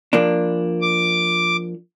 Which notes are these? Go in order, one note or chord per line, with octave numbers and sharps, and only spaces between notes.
F3 A#3 D4
D6